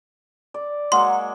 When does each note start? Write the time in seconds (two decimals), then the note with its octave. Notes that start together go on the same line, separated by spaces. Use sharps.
0.54 D5
0.92 F#3 G#3 A#3 F#5 C6